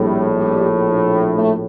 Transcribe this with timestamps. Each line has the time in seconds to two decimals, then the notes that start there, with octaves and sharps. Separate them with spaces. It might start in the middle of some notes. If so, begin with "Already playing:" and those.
Already playing: A#1 A2 G3
0.34 G3
1.36 A3